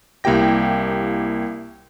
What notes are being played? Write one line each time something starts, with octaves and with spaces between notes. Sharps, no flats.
C2 A#3 E4 G4 G5 A#6